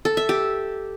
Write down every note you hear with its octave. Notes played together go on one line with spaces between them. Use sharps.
A4
E5
G4